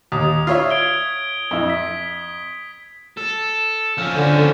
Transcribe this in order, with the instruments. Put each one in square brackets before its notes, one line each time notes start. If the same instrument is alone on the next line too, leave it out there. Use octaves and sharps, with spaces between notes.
[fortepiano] D#2 [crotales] D#6
[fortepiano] F4 C#5 E5
[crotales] G#6 D7 G7
[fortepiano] F2 E4
[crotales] B6
[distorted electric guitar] A4
F3 C#4
[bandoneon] D3